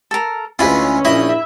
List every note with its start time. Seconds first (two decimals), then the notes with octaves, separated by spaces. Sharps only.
0.11 A4 A#4
0.59 D2 G#3 C#4 E4 F4 B4
1.05 A#1 E4 D#5
1.29 E5